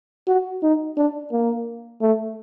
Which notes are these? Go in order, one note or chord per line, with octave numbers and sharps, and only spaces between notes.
F#4
D#4
D4
A#3
A3